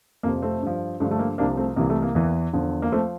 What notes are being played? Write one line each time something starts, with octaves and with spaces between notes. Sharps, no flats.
F2 C3 F3 A#3
A3 C4
G2 F3
G2 D3 F3 A3
A3
A#3
C2 C3 F3 A#3 D4
A3 C4
C2 C3 E3 A#3
A3
A#3
E2 E3
E2 D3 F3
A#3
F3 A3 C4